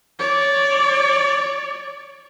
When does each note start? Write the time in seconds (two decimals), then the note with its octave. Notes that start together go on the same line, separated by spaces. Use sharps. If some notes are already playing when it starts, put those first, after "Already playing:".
0.19 C#5 D5